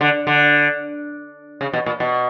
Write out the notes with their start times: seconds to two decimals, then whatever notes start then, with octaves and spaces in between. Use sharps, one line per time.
0.01 D3
0.27 D3
1.61 C#3
1.73 B2
1.86 A#2
2.00 B2